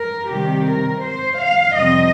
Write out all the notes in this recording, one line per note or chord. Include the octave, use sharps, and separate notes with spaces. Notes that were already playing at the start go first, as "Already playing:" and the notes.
Already playing: A#4
C3 D#3 G3 G4
A#4
C5
F5
F2 C3 G3 C4 D#5